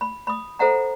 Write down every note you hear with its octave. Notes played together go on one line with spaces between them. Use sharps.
B5
B5 D#6
A4 C5 E5 F#5 A#5